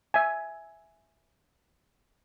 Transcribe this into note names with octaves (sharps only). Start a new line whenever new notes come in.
E5 G#5